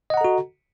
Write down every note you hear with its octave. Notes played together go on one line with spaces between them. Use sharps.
F#4 A4 D#5 F#5 A#5